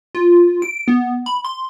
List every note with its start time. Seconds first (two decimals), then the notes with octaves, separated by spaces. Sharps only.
0.15 F4
0.62 D7
0.88 B3
1.26 B5
1.45 C6